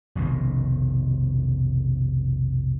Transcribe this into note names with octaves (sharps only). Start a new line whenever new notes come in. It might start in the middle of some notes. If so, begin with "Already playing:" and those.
F1 B1 B2 D#3